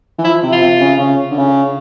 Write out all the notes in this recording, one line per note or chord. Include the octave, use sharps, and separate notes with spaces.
E3
F3 E4
C3
F4
C3
C#3
C#3
D3
C#3